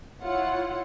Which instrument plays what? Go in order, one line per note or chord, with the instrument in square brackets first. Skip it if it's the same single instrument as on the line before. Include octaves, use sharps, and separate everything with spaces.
[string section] E4 F4 C#5 F#5